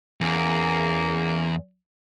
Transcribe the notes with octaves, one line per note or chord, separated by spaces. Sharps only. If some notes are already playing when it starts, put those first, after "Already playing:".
E2 C#3 A#3